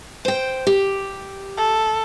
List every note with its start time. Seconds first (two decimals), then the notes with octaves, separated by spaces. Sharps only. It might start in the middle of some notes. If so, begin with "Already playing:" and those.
0.25 C5 G5
0.67 G4
1.57 A4